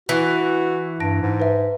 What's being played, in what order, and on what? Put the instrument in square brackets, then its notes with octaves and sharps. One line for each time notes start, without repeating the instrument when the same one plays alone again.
[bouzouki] E3 [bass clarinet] F#4
[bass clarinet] G2 [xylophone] A5 A#6 D7
[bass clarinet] G#2
[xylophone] B4 E5